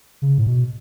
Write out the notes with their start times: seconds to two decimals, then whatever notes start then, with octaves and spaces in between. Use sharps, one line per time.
0.22 C#3
0.38 A2
0.47 B2